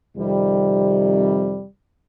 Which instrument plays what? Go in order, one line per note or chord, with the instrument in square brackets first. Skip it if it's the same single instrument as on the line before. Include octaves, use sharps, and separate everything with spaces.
[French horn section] F2 C3 D#3 G3